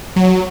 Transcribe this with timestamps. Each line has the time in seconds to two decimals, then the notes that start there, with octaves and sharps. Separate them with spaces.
0.16 F#3